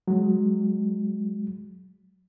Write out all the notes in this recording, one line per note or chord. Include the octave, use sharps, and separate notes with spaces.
F#3 G#3